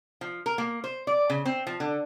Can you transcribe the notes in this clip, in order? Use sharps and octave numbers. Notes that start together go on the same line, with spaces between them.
F3
A#4
A#3
C5
D5
C#3
C4
F3
D3